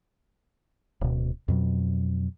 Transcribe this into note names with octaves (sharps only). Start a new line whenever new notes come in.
D1 B2
F2 B2 F#3